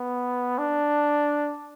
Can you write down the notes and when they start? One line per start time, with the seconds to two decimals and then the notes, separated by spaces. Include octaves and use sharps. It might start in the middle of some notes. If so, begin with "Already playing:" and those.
Already playing: B3
0.58 D4